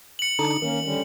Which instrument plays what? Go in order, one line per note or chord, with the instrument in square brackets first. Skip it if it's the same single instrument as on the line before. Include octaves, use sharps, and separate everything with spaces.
[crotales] C#7 F#7
[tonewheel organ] D3 D4 D#4
[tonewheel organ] D#3 [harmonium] A#3 C#4
[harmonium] D3 G3 C#4